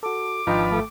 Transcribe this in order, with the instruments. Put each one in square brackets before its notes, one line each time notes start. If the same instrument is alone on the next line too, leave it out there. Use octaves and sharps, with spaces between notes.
[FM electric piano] F#4 A4 [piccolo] D6
[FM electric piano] G#1 G5 [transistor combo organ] F3 B4 [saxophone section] D4 D#4 F4
[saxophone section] A3